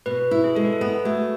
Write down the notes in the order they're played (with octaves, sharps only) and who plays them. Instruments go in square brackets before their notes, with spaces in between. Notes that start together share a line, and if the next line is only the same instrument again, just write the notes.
[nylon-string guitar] B2 [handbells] B4
[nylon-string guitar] E4
[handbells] G#4
[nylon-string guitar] G#3 [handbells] A4
[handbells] B4
A4
[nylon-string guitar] B3 [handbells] G#4
[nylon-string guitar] A3 [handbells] F#4